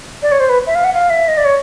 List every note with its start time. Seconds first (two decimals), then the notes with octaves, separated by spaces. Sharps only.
0.22 D5
0.32 C#5
0.40 C5
0.49 B4
0.67 E5
0.75 F5
0.84 F#5
0.94 F5
1.10 E5
1.28 D#5
1.37 D5
1.45 C#5